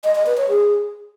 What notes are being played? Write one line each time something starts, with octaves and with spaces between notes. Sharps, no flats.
D#5
D#5
B4
C#5
G#4